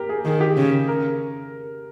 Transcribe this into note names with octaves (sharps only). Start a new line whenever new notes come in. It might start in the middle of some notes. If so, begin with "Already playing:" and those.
Already playing: G4 A#4
G#4
D#3 G#4
G4
C#3
A#4